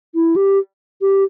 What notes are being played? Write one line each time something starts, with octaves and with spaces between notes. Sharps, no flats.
E4
G4
G4